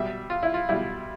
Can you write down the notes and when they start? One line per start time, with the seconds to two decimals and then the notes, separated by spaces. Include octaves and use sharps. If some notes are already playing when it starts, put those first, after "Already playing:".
Already playing: B2 G3 E5
0.30 F4
0.43 E4
0.54 F4
0.69 B2 G3 E4